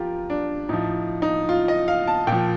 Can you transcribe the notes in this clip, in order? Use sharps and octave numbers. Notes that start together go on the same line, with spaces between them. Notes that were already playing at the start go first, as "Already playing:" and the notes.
Already playing: F3 F4 G4 A#4
D4
A2 F3 D#4
D#4
F4
D#5
F5
A5
A#2 G5
F3